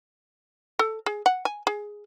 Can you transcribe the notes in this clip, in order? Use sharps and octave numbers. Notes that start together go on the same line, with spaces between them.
A4
G#4
F#5
G#5
G#4